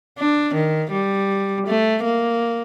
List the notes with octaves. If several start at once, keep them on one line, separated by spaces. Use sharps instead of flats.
D4
D#3
G3
A3
A#3